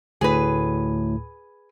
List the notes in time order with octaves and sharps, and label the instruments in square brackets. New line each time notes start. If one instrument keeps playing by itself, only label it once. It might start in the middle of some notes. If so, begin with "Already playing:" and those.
[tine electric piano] D2 A2 [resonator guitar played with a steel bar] G#4 B4